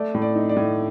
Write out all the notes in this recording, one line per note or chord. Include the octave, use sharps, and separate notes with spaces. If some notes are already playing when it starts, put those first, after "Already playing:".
Already playing: A3 D5
A2
D5
D#4
D5
A2